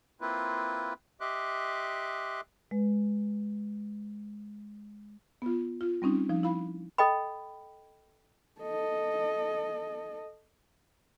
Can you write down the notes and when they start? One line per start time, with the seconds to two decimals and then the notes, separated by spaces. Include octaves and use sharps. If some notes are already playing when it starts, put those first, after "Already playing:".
0.21 A#3 C4 E4 F4 B4
1.21 G4 D#5 E5 C6 D6 F#6
2.71 G#3 B4
5.42 B3 F4
5.81 F4
6.02 G3 C4 C#4 D#4
6.29 F3 D#4
6.43 E4 F5 B5
6.98 A4 D#5 G5 B5
8.61 A4 D#5